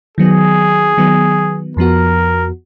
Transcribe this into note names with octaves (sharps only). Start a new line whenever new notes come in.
D#3 F#3 B3 G#4
D#3 F#3 B3
F2 F3 B3 F#4 A#4